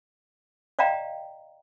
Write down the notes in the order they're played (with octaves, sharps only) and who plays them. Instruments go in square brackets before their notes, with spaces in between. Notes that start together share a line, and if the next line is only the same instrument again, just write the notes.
[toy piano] D5 D#5 F5 G5 A#5